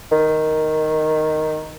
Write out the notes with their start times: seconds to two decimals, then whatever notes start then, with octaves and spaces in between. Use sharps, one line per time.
0.12 D#3